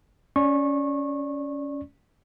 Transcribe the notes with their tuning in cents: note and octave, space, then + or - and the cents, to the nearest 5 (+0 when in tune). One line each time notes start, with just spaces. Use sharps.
C#4 +20 D5 +0 C#6 -25